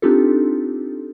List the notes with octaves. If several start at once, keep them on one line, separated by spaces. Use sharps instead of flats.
C4 D4 D#4 F4 G4 A4